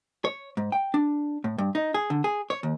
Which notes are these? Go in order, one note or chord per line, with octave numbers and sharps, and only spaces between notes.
C#5
G#2
G5
D4
A2
G2
D#4
G#4
D3
G#4
C#5
D#2